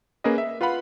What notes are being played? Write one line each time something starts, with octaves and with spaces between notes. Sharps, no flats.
A#3 C#4 G#4 A#4 B4 D#5
E5
F4 B4 F5 F#5 B5